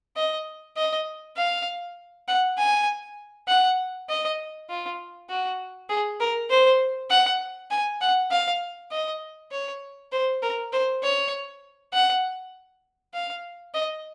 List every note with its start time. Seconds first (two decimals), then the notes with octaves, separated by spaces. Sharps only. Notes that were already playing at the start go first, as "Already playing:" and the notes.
0.17 D#5
0.77 D#5
1.37 F5
2.28 F#5
2.58 G#5
3.48 F#5
4.09 D#5
4.69 F4
5.30 F#4
5.89 G#4
6.20 A#4
6.50 C5
7.10 F#5
7.71 G#5
8.01 F#5
8.31 F5
8.91 D#5
9.52 C#5
10.12 C5
10.42 A#4
10.73 C5
11.03 C#5
11.93 F#5
13.14 F5
13.74 D#5